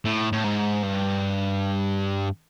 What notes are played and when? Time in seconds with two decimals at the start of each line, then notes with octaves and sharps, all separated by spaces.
0.05 A2
0.32 A2
0.44 G#2
0.82 G2